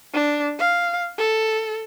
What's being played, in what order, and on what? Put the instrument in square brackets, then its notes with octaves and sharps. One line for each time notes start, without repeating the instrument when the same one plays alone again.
[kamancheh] D4
F5
A4